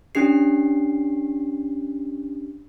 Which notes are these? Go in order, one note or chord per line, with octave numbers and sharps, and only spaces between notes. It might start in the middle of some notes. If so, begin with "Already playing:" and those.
C#4 D4 G4 C7